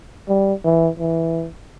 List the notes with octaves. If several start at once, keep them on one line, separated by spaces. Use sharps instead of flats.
G3
E3
E3